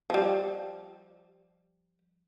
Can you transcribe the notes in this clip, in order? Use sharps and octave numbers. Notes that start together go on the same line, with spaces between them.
F3 G3